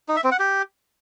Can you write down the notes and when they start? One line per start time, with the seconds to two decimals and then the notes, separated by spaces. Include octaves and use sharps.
0.09 D#4
0.16 E5
0.24 C4
0.32 F#5
0.39 G4